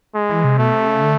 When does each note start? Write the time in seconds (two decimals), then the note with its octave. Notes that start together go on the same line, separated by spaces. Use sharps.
0.15 G#3
0.30 E3
0.44 C3
0.58 B2 A3
0.73 C3
0.87 C#3
1.02 D3